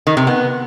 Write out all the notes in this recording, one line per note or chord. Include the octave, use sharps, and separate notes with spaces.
D#3
C3
B3